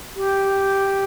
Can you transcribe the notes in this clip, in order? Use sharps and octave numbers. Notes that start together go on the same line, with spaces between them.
G4